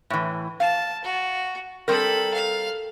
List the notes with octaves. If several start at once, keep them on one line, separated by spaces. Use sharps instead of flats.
A2 E3
F5 A5
F#4
G3 C4 A4 A#4 B5
F5